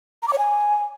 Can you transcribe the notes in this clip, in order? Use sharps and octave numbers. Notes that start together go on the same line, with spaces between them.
A#5
D6
C#5
G#5